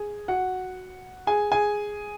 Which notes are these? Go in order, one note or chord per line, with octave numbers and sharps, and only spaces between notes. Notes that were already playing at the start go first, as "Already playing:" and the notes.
Already playing: G#4 G#5
F#4 F#5
G#4 G#5
G#4 G#5